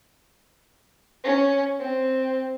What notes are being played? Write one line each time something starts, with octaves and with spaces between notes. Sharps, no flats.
C#4
C4